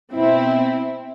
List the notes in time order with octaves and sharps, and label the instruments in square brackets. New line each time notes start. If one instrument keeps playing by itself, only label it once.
[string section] B2 C4 E4